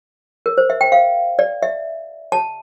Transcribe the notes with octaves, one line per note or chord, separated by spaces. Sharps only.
A#4
C5
E5
G5
F5
D5
E5
A5